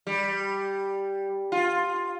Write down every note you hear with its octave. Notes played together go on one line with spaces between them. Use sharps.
G3
F4